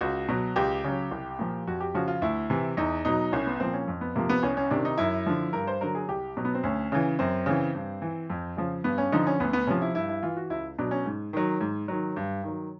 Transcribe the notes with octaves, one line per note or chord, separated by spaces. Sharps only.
C#2 F#4
B2 F#3
C#2 G4
C#3 F#3
C2
A#2 F3
F2 F#4
G4
C#3 F3 F#4
F4
D2 E4
C3 E3
E2 D#4
B2 F#3 D#4
C2 C#4
B3
A#2 F3 C4
C#4
F2
B3
C3 F3 A#3
B3
C2 C#4
C#4
C3 D#3 D4
D#4
F#2 E4
D3 F3
G2 A#4
C5
D3 F#3 A#4
G#4
C2 G4
B2 F#3
B3
C4
D2 C#4
C#3 E3
F#2 C4
C#3 E3
G2
E3
F2
C#3 F3
G2 B3
C#4
D3 F3 D#4
C#4
D2 B3
B3
C3 F3 C#4
E4
G2 E4
E4
E3 F4
F#4
C#2 E4
B2 F#3 D4
C#4
G#2
D#3 F#3
G#2
D#3 F#3
G2
D#3 F#3